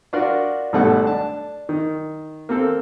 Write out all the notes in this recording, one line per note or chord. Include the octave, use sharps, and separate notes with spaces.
D4 F4 F#4 A#4 D5
G#1 B2 G3 A3 A4 F#5
D4 A5
D#3
A#3 C4 A4